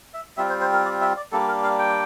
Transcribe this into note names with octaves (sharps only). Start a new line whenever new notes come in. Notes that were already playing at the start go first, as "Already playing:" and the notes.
E5
G3 C4 F4 E5
C5
C5
A#4
D5
E5
D5
G3 A#3 D4 A4
A#4
F5
G5